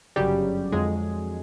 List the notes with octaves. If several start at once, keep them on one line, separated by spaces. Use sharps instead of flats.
G1 F#2 C#3 F#3 G3 G4
F2 D3 F#3 G#3 G#4